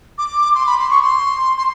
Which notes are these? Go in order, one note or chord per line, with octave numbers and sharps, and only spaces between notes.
D6
C6
B5
C6
C#6
C6
C6